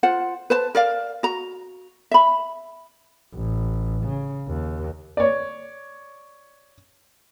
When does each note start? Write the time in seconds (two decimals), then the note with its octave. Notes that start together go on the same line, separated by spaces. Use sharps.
0.03 F4 C5 F#5
0.50 B4 C5 A5
0.75 A#4 D5 F5
1.23 F#4 A#5
2.11 E5 B5
3.34 A1
4.04 C#3
4.48 D#2
5.17 C#5 D5